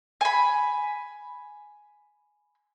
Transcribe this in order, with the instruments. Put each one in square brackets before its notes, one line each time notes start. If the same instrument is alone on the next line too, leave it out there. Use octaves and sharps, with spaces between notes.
[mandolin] G#5 B5